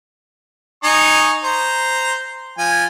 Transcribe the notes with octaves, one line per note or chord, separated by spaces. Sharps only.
D#4 G#5 C#6
C5 A#5
F3 G#5